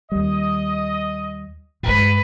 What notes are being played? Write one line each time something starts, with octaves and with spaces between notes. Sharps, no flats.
D#2 G3 D#5
G2 G#3 B4